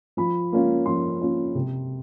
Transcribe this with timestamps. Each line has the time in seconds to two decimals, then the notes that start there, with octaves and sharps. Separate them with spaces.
0.17 F3 B5
0.52 A#3 C#4 F4
0.86 F3 C6
1.20 A#3 C#4 F4
1.55 C3